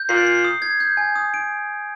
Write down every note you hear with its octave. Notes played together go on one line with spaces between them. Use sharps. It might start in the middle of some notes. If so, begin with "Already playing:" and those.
Already playing: G6
A#2 C7
C7
D#6
G#6
G6
G#5
D#6
D7